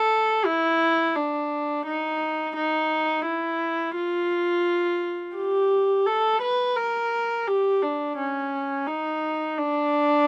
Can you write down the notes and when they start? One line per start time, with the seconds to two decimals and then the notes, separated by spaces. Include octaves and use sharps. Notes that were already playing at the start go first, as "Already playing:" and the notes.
Already playing: A4
0.46 E4
1.16 D4
1.86 D#4
2.56 D#4
3.27 E4
3.96 F4
5.37 G4
6.07 A4
6.42 B4
6.77 A#4
7.47 G4
7.82 D4
8.18 C#4
8.87 D#4
9.58 D4